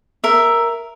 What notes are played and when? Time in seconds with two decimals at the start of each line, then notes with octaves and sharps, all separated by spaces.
0.24 A#4 E5